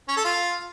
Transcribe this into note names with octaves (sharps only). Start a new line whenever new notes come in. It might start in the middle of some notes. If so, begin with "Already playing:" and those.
C#4
A4
F4